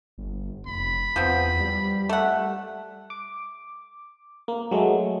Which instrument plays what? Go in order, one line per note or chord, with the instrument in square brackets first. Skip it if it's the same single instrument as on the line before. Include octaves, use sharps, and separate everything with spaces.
[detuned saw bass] G1
[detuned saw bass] F1 [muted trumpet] B5
[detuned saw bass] E2 [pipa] F3 B3 C4
[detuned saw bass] G3
[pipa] A3 F#5
[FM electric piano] D6
A#3
F#3 G#3 A3